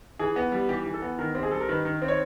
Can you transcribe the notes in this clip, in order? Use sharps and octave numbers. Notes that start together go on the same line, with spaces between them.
E3 G#4
B3
G3
E3 G4
E3
A4
B3
D#3 A#4
C4 G4
G#4
G3 A4
A#4
D#3 B4
D#3
C4
C#5